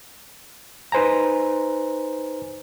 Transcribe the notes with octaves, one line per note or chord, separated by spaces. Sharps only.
D#4 B4 C5 G#5 A#5